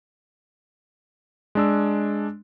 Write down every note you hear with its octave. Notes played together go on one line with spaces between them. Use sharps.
G#3 D4 E6